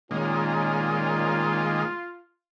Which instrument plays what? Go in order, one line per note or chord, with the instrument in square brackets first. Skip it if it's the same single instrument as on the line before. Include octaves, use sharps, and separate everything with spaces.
[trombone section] A#2 C#4 [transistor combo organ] D#3 G#3 A#3 [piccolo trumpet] F4